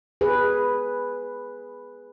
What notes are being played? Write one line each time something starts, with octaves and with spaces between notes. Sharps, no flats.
G#4 B4